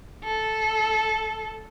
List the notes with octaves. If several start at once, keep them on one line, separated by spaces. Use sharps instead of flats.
A4